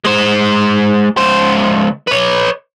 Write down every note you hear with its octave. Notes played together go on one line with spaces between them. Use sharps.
G#3 C5
C#2 C5
B4 C#5